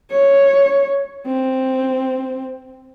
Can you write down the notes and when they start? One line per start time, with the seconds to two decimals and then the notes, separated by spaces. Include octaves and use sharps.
0.11 C#5
1.26 C4